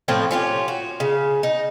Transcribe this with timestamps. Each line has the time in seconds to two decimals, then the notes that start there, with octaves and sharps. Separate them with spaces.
0.08 A2 F3 C4 F4
0.31 C#4 F4 G4
0.68 F#4
1.00 C#3
1.43 D#4